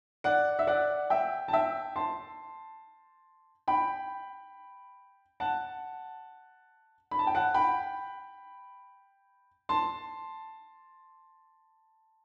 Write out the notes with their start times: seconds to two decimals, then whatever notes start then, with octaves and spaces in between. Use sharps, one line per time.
0.24 D5 F#5
0.59 E5
0.67 D5 F#5
1.10 E5 G5
1.48 A5
1.53 E5 G5
1.96 A5 C6
3.68 G5 B5
5.40 F#5 A5
7.11 B5
7.19 A5
7.27 G5
7.34 F#5 A5
7.54 G5 B5
9.69 A5 C6